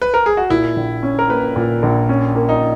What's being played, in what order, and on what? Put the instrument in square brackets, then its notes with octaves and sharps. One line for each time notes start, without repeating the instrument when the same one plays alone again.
[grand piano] B4
A#4
G#4
F#4
[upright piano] A#2 [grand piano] E4
[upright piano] A#1
C#4
[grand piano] A#4
[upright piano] A#3 [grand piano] B4
[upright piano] A#2
A#1
C#4
A#3
[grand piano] D#4